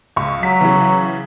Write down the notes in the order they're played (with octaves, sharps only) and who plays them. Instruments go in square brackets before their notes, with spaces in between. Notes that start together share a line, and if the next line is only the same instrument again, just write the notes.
[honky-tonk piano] C#2 C#6
[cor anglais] F#3 [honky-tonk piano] B6
[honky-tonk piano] C#3 E3